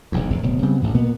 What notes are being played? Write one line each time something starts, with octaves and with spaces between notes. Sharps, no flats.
E1 B1 E2
E1 A2
D1 B2
C#3 G3 B3 C4
A1 G#2 B2 E3
A#2 A#3 B3